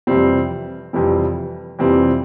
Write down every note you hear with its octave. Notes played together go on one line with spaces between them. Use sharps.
F2 C3 E3 G3 C4
F2 C3 E3 G3 C4
F2 C3 E3 G3 C4